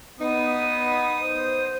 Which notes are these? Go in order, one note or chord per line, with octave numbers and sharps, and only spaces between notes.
B3 D#4 D#6
C5